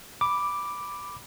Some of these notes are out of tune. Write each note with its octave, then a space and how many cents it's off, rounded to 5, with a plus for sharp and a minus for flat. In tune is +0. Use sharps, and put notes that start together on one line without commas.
B5 +0 D6 +0